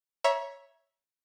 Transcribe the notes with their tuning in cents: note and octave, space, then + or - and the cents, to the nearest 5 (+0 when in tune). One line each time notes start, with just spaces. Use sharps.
C#5 +0 E5 +0 A#5 +35